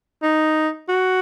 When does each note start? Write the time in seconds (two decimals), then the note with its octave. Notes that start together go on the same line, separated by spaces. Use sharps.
0.22 D#4
0.89 F#4